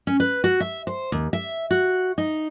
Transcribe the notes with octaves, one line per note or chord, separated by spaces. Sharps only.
C#4
B4
F#4
E5
C5
D#2
E5
F#4
D#4